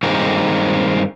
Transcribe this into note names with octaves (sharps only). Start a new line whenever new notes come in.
G2 D#3 G#3 A#3 C4